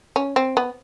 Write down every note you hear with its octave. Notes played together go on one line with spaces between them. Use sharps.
C#4
C4
B3